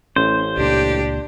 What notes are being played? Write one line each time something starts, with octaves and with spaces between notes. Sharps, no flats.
A1 C#4 C5
C#2 A#2 D4 G4